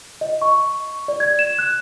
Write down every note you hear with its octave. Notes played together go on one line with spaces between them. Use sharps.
D#5
C#6
D5
G#6
E7
F#6